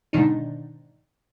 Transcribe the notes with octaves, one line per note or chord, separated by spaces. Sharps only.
G#2 B2 D3 D#3 D4 D#4